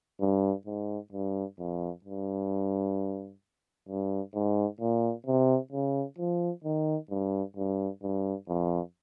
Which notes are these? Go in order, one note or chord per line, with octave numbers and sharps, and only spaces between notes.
G2
G#2
G2
F2
G2
G2
G#2
A#2
C3
C#3
F3
D#3
G2
G2
G2
F2